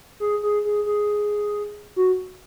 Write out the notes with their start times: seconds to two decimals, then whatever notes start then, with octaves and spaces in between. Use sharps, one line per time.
0.20 G#4
0.43 G#4
0.65 G#4
0.86 G#4
1.96 F#4